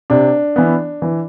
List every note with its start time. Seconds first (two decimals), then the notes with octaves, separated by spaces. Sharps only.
0.10 C3 D4
0.56 E3 B3
1.02 E3